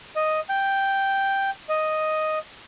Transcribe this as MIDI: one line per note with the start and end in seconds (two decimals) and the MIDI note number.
0.16 0.40 75
0.49 1.50 79
1.69 2.39 75